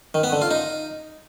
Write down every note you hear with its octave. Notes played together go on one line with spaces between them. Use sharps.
D#3
B3
D3
F4
D#4